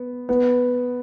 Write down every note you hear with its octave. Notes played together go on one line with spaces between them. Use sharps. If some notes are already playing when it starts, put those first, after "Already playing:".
Already playing: B3
B3